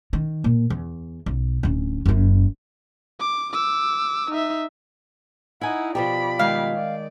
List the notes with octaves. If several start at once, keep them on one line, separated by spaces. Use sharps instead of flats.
D#3
A#2
E2
B1
D1 C#4
F#1 F#2
D6
D6 E6
D#4 E5
D#4 E4 F#5 G#5
B2 F3 G4 D5 B5
D#3 G#3 F5
D5